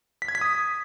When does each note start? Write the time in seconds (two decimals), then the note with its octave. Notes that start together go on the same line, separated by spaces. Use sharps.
0.22 B6
0.28 G#6
0.35 B6
0.41 D#6